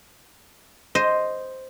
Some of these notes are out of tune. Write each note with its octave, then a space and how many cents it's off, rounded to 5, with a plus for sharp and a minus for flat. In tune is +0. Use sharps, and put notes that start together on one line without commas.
C5 +0 D#5 +0